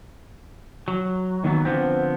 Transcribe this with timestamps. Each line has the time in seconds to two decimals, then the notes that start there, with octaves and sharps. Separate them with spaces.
0.88 F#3
1.44 D#2 D#3 E3 F#3 B3
1.65 D3 F3 B3 C4